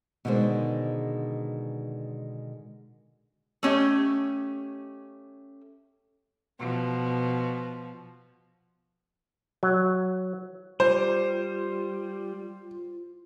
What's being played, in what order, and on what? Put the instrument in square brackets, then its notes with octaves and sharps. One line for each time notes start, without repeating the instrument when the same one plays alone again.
[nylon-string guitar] B2 D3 D#3 G#3 C5
[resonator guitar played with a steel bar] A3 C#4 G4 D#5
[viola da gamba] B2 F3
[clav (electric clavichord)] F#3
[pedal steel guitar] G3 [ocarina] F4 [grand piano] C5